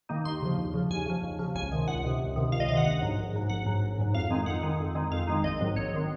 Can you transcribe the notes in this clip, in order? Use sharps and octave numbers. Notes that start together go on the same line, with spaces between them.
D#3 A#3 D#4
D#2 C6
C#3 F3
D#2
C#3 F3
D#2 G#5
C#3 F3
D#2
C#3 F3
C#2 G#5
C3 D#3
C#2 F#5
C3 D#3
C#2
C3 D#3
C#2 F5
D#5
C3 D#3 F5 F#5
A#1 F#5
G#2 F#3
A#1
G#2 F#3
A#1 F#5
G#2 F#3
A#1
G#2 F#3
F2 F5
D#3 G#3 C4 D#4
F2 F#5
D#3 G#3 C4 D#4
F2
D#3 G#3 C4 D#4
F2 F5
D#3 G#3 C4 D#4
A#1 D#5
G#2 D#3 F#3 C4
A#1 C#5
D#3 F#3 C4